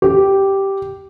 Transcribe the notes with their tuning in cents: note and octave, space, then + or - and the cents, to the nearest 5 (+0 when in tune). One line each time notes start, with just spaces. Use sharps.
G4 -5